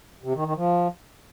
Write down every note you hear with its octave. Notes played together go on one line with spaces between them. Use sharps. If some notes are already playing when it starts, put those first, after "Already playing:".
C3
D#3
D#3
F3